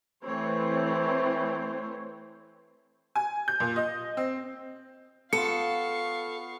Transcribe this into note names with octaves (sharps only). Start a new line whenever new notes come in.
E3 A3 C4 C5 C#5
G#5
G6
A#2
D#5
C4
B3 F4 A4 F5 C#6 C#7